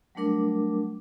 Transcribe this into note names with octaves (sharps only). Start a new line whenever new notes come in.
F#3 G3 A3 D4 A#4 D6